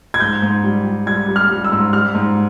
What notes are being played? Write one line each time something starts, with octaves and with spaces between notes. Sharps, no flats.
G#6
G#2 G6
G#2
G3
G3
G3 G#6
G3
F6
G3
E6
G#2
G3 F6
G#2